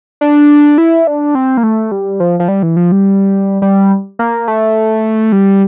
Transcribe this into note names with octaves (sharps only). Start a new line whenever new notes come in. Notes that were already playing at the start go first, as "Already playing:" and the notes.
D4
E4
D4
C4
A#3
A3
G3
F3
F3
G3
E3
F3
G3
G3
A#3
A3
G3